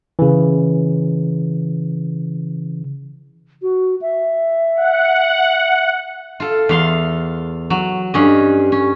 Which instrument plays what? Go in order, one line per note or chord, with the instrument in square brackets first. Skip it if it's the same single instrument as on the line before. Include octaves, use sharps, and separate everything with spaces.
[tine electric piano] C#3 E3
[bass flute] F#4
E5
[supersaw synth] F#5
[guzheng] F4 A4
E2 F5 C6
F#3
G2 C#4 D#5
C#4